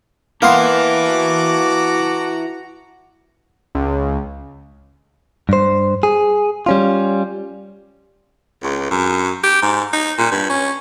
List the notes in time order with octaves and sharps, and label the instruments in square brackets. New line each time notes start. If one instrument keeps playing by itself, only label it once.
[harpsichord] A#3 B3 C6 [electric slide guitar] E4 B4 [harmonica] A5 A#5 D6
[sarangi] F#4
[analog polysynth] C#2
[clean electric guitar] G2 C5
G#4
G3 C#4 F4
[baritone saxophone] C#2
F#2
G4
G#2
D#4
A#2
G2
C#4